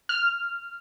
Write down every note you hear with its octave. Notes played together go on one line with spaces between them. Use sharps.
F6